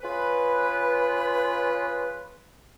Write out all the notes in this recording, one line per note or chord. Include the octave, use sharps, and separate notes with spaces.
C#4 F4 G#4 B4